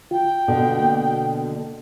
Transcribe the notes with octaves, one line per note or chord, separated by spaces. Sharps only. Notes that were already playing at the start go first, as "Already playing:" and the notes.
F4 G5
B2 D3
A#3